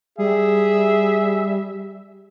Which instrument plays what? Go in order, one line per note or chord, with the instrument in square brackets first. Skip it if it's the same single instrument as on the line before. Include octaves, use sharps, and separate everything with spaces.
[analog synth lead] G3 [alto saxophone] G#4 [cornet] E5